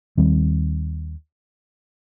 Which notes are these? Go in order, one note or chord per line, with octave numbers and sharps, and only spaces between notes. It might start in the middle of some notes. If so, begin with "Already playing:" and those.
D#2 D#3 G3 C4